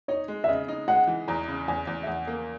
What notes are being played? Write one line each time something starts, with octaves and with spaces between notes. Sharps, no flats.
D#4 C#5
G#3
E5
C#3 D#5
D#4
G#3 F#5
E3
E2 A#5
C#3
E2 G#5
E2
E5
E2 F#5
A#3